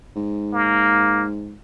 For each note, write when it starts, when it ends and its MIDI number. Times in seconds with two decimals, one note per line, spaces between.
0.16 1.57 44
0.54 1.25 58